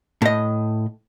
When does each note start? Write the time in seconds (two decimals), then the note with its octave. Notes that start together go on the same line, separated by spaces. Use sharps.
0.22 A2 D#5